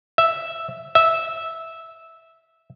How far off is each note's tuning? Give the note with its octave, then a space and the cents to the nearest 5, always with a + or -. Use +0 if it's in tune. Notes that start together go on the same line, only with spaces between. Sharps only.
E5 +0
E5 -10